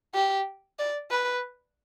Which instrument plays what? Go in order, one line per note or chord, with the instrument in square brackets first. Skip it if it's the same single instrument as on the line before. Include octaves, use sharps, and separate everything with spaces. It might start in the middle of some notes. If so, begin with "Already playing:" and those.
[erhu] G4
D5
B4